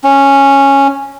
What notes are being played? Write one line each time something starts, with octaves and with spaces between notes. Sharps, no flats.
C#4